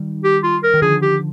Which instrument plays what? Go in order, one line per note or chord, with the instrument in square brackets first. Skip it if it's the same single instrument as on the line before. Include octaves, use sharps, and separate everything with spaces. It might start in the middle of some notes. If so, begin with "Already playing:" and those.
Already playing: [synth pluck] D#3 G3
[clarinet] G4
F4
A#4
[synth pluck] D#3
[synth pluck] D3 F3 [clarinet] G#4
[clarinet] G4